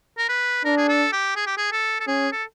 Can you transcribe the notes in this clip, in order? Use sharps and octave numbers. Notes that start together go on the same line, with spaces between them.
A#4
B4
D4 A#4
G#4
A4
G4
G#4
G4
G#4
A4
A4
C#4 G#4
A4